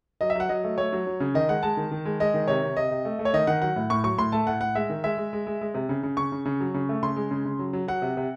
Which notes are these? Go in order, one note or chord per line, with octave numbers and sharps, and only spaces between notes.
F#3 D#5
E5
F#3 F#5
F#3 D#5
A3
A3 C#5
F#3
F#3
C#3
D#3 D#5
G#3 F#5
G#3 A5
D#3
D#3
G#3
G#3 D#5
D#3
C3 C#5
C3
C3 D#5
C3
A3
A3
C#5
D#3 D#5
D#3 F#5
F#3 F#5
A2
A2 C#6
F#3 C#6
A2 C6
A3 A5
A2 F#5
A2 F#5
G#3 E5
D#3
G#3 E5
G#3
G#3
G#3
G#3
C3
C#3
C#3
C#3 C#6
C#3
C#3
F#3
C#3
A3
C#3 C6
G#3
C#3
C#3
F#3
F#3
F#3 F#5
C3
C3